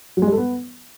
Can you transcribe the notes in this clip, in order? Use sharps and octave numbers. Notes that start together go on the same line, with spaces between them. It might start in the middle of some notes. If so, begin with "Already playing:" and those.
F#3
G#3
G3
A4
B3